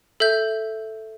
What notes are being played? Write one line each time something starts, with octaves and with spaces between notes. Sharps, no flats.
A4 E5 G6